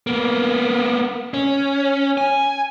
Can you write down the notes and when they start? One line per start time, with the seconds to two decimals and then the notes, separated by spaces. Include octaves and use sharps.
0.07 A#3 B3
1.34 C#4
2.18 G#5